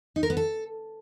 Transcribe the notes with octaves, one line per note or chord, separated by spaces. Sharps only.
D#4
A#4
B3
A4